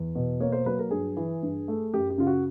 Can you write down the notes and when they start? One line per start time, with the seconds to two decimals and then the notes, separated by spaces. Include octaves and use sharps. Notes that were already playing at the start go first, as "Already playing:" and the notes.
Already playing: E2
0.15 B2
0.40 A#3 C#5
0.52 C5
0.66 F#3 B4
0.79 A#4
0.91 G2 G#4
1.17 E3
1.43 G2
1.68 A3
1.94 F#2 G4
2.10 G4
2.18 C#3 F4
2.27 F#4